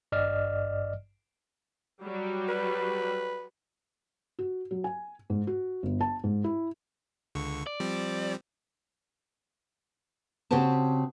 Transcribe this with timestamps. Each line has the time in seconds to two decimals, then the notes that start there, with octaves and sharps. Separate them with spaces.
0.12 G#1 G2 D5 D#5 F6
2.02 F#3 G3
2.48 B4
4.39 F#4
4.71 F#3
4.84 G#5
5.30 G#2
5.47 F#4
5.83 G1
6.01 A5
6.24 G#2
6.44 E4
7.35 C#2 D3 C#6
7.67 D5
7.80 F3 G3 C4
10.51 C#3 C4 F#4 G4 C5 A5